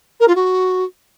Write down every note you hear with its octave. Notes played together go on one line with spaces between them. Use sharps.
A#4
F4
F#4